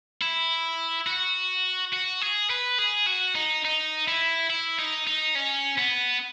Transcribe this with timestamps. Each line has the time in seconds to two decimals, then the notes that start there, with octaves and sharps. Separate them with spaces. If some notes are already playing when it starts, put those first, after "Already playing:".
0.22 E4
1.07 F#4
1.93 F#4
2.21 G#4
2.50 B4
2.79 G#4
3.07 F#4
3.35 D#4
3.65 D#4
4.08 E4
4.50 E4
4.79 D#4
5.07 D#4
5.35 C#4
5.78 B3